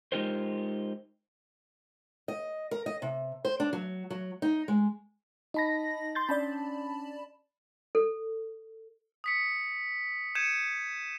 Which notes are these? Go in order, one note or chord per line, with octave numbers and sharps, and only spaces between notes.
G#3 D#4 F4 G4 A#4 C5
D#5
A#4
D#5
C3
C5
D4
F#3
F#3
D#4
G#3
D#4 D#5 A5 B5 A#6
C6 G6 A6
C#4 D4 D5 A5 B5
A4
D#6 B6 C#7
G6 G#6 C#7 D#7 E7